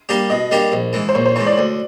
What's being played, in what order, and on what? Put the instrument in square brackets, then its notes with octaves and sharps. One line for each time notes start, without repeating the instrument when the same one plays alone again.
[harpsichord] G3 A#3 D4 G4
[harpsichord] B2 [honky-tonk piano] D#5
[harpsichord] G3 A#3 D4 G4
A#1
G#2 E3
[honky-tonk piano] C5
[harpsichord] A#1 [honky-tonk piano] C#5
[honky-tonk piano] C5
[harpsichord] G#2 E3 [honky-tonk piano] C#5
[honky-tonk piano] D5
[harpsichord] D2 [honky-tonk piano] D5